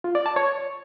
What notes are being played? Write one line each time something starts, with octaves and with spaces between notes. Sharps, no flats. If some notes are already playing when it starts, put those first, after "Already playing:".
F4
D5
A5
C#5